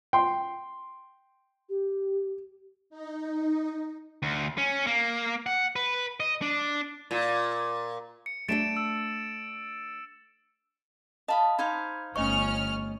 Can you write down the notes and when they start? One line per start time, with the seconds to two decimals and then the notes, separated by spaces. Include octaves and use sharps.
0.13 G5 C6
1.70 G4
2.90 D#4
4.22 D2
4.58 C#4
4.87 A#3
5.46 F#5
5.76 B4
6.20 D#5
6.42 D4
7.11 A#2
8.26 C#7
8.48 A3 D4 A4 A6 D7 E7
8.77 E6
11.28 D#5 F5 A5 B5 D#6
11.59 D#4 C5 F5 B5 G#6
12.16 G1 A3 C#4 D#5 C#6 F6